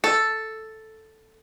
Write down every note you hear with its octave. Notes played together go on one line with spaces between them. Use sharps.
A4